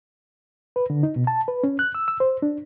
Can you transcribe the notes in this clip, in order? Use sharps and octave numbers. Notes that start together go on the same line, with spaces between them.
B4
D3
D#4
B2
A5
B4
C#4
F#6
E6
E6
C5
D4